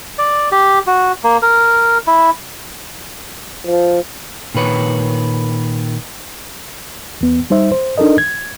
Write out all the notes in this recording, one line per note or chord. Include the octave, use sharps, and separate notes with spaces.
D5
G4
F#4
A#3
A#4
E4
F3
A#2 D#3 B4 C#5
E2 B3
G3 D#4 C5 E5
C5
D4 D#4 A4 A#4 D#5
G#6